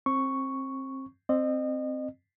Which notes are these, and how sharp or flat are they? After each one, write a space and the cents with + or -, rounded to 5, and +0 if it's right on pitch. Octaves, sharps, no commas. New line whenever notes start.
C4 +25 C#6 +0
C4 +0 D#5 -30